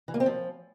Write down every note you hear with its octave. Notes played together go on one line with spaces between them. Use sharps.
E3
A#3
C4
F3